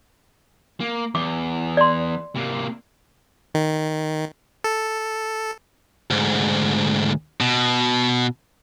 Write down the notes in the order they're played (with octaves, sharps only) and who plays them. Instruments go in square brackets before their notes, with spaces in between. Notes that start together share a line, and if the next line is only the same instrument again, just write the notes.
[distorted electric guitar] A#3
[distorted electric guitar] E2 [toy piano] D6
[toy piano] D5 C6
[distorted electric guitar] C3 A#3
[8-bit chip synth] D#3
A4
[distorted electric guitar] D2 G#2
B2